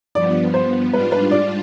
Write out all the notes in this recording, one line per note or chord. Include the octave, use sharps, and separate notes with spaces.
G2 F3 B3 D5
C5
G#2 G3 D4 F4 B4
B4
D5